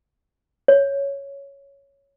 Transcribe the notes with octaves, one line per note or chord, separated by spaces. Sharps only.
C#5